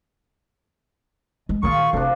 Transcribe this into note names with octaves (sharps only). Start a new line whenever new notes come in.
G#3
A#2 D#3 F4 G#4 A#4 C#6
F1 D2 F3 D4